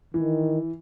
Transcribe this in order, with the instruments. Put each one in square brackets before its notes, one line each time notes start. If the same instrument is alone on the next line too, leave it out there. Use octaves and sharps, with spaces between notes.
[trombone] D#3 [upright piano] E3